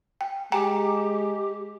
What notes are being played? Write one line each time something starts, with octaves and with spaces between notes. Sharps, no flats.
G5
G#3 G4 G5 G#5 A#5